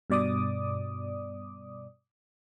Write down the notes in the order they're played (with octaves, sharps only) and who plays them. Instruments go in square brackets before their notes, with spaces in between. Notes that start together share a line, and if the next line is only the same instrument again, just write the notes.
[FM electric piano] G2 B2 D5 D6 D#6